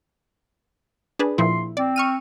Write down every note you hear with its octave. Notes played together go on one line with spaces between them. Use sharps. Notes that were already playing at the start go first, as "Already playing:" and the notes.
D4 G#4 B4
A#2 F3 E4 C6
C4 D5
C#6 F6 D#7